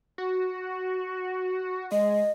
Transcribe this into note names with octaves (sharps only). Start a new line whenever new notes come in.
F#4
G#3 D#5